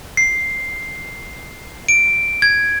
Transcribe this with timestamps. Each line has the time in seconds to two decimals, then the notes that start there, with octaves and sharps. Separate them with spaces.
0.17 C7
1.89 D7
2.42 G#6